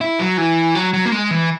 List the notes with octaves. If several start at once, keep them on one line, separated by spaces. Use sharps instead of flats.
E4
F#3
E3
F#3
F#3
A#3
G#3
E3